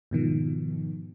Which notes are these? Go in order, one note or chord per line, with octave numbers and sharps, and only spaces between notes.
G#2 B2 D#3 F3